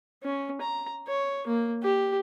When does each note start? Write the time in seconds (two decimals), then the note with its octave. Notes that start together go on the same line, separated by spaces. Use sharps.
0.23 C#4
0.61 A#5
1.07 C#5
1.47 A#3
1.83 G4